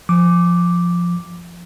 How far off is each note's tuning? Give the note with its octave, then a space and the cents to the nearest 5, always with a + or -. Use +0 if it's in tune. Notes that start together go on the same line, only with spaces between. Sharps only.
F3 +0 D6 +0